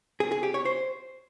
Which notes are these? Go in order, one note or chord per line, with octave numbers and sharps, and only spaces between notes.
G#4
G#4
G4
C#5
C5